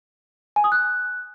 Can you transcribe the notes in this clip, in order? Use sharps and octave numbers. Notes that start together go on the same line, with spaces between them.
G#5
D#6
F#6